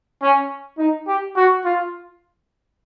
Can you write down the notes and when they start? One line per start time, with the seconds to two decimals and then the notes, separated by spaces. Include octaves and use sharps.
0.22 C#4
0.78 D#4
1.08 G4
1.36 F#4
1.65 F4